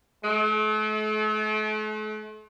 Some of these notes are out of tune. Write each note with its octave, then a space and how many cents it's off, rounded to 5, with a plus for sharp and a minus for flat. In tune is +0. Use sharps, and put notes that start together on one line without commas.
A3 -40